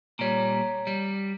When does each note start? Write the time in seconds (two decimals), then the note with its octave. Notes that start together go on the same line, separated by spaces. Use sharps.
0.19 A#2 G3 C#5 A#5
0.87 G3